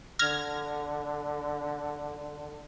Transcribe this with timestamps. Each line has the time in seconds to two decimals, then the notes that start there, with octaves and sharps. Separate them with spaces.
0.19 D3 F6 G#6 A#6